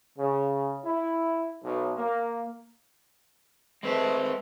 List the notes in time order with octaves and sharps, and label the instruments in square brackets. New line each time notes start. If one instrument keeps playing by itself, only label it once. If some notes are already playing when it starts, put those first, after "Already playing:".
[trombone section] C#3
E4
B1
A#3
[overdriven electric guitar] G#3 C4 [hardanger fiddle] A3 B4